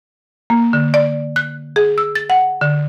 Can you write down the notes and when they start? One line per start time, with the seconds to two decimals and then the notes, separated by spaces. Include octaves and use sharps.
0.50 A#3
0.73 D3
0.94 D5
1.36 F#6
1.76 G#4
1.98 E6
2.15 A6
2.30 F#5
2.61 D3